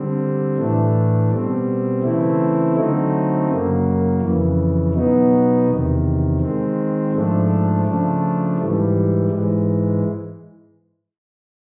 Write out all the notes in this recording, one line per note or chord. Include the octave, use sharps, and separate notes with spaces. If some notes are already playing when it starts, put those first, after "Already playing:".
Already playing: D3 G3 C4
A2 E3 A3 D4
B2 G3 C4
C#3 E3 A3 C4 E4
D3 F#3 A3 C4 D#4
F#2 C#3 F#3 A#3
F2 C#3 E3
B2 F#3 B3 D#4
E2 C3 D#3
D#3 G#3 C4
G#2 F3 A3 D4
C#3 F3 A3 D4
G#2 E3 G3
G#2 E3 G#3